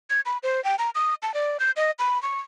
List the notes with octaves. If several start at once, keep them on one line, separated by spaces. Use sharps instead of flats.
G#6
B5
C5
G5
A#5
D#6
A5
D5
G6
D#5
B5
C#6